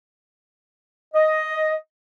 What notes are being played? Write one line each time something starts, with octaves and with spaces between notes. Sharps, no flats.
D#5